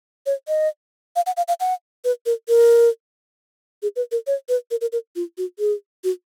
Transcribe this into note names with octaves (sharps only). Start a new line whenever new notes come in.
C#5
D#5
F5
F#5
F5
F5
F#5
B4
A#4
A#4
G#4
B4
A#4
C#5
B4
A#4
A#4
A#4
F4
F#4
G#4
F#4